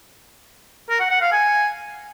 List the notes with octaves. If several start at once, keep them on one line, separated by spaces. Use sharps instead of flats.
A#4
F#5
F#5
F5
G#5